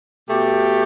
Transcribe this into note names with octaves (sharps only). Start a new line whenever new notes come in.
B2 A3 G4